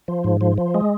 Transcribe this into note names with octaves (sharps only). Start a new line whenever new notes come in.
F3
G#2
F3
F3
G#3